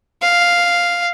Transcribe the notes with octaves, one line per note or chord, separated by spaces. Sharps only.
F5